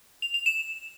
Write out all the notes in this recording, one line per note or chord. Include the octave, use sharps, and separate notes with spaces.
F7
F7
E7